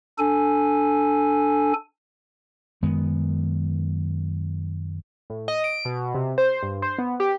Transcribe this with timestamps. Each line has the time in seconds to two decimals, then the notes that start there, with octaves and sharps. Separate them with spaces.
0.19 D4 A4 G#5
2.83 F#2 D#3 G#3 B3
5.30 A2
5.48 D#5
5.64 D7
5.85 B2
6.15 C3
6.38 C5
6.63 G2
6.82 C5
6.99 B3
7.20 G4